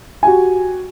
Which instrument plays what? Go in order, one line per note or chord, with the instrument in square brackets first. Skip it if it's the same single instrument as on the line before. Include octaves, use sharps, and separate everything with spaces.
[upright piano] F#4 G4 G#5